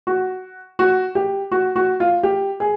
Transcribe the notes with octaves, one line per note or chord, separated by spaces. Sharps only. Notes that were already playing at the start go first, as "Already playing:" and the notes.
F#4
F#4
G4
F#4
F#4
F4
G4
G#4